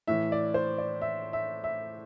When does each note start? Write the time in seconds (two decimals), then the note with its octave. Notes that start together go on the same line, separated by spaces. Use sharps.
0.07 A2 E3 E5
0.32 D5
0.54 C5
0.78 D5
1.02 E5
1.33 E5
1.64 E5